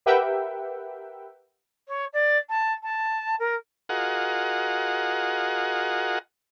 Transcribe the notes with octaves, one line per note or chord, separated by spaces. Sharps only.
G4 A#4 B4 E5 F#5 G5
C#5
D5
A5
A5
A#4
F4 F#4 G#4 A#4 D#5 F#5